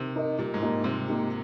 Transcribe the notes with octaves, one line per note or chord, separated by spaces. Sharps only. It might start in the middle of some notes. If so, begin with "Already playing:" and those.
Already playing: C3 D#3
D#4 A#4 D#5
A#2 G3
G#2
A#3 D#4 G4
A#2
C3 G3
A#3 D#4 G4